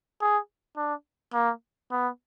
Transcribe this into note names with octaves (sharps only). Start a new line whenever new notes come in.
G#4
D4
A#3
B3